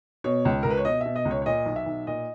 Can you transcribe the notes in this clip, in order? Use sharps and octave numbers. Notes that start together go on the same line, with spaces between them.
B2 C#5
C#2
C#2 A#4
B4
C#5
B2 D#5
B2 E5
D#5
C#2
C#5
C#5
A#2 D#5
B1
E5
B1
A#2 D#5